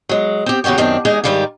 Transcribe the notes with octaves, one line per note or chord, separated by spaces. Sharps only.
F#3 G#3
C4 G4
E2 C#3 F#4 C#5 G5
F#2 D#3 C4 D4
E2 G#3 D#4 G#4 D#5 G#5
G#2 D#3 G3 G4 F5